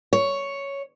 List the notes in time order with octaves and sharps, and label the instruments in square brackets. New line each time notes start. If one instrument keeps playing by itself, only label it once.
[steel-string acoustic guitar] C#5